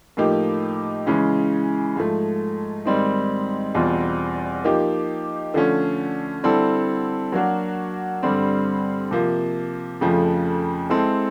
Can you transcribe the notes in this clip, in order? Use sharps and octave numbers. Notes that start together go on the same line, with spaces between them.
A2 F3 A#3 D#4 G4
C#3 E3 G#3 C#4
G#2 F3 A3
G#2 D#3 G3 C4 D#4
E2 B2 G3 C4 F4
F3 A#3 D#4 G4
D3 F3 A3 C#4
D3 G3 C4 E4 A4
F#3 A#3 D4 F#4 A#4
G2 D3 G3 C4
C3 F3 A#3
F2 C#3 F3 A3
G#3 C4 E4 A4